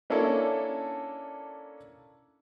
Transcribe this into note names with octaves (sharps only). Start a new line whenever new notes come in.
A#3 C#4 D4 E4 A4